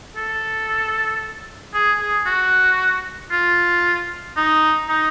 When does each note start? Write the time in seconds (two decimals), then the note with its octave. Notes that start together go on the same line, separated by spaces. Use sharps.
0.16 A4
1.74 G#4
2.01 G#4
2.26 F#4
3.32 F4
4.37 D#4
4.89 D#4